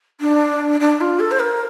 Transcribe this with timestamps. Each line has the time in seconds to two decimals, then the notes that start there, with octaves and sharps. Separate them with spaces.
0.20 D4
0.80 D4
1.00 F4
1.19 A4
1.31 C5
1.39 A#4